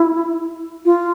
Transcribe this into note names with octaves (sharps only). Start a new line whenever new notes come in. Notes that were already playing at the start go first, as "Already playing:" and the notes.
Already playing: E4
F4